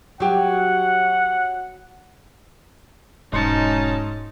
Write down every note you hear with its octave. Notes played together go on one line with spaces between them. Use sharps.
F#3 G4 F#5
E1 G#2 F#3 C#4 D#4 A5 C6 C#7